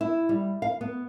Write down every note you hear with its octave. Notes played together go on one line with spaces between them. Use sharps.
E4
G3
F5
B3